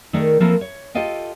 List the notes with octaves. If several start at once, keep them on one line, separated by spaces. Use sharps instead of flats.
D#3 A3 G#4 A#4 D5
F3 A#3 C4 E4 A4 A#4
C#5
F4 G4 A4 D#5 F5 G5